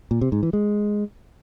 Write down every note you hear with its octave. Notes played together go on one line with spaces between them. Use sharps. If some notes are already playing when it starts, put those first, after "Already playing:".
A#2
C3
G#2
E3
G#3